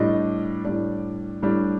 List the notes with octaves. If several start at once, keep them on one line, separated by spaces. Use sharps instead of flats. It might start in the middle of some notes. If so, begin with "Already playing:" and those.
Already playing: A2 G3 D4 D#5
A2 G3 D4 D5
A2 G3 D4